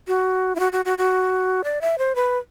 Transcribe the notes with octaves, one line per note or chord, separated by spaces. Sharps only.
F#4
E4
F#4
F#4
F#4
F#4
D5
E5
C5
B4